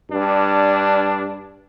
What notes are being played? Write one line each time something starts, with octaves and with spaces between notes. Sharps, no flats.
G2 D4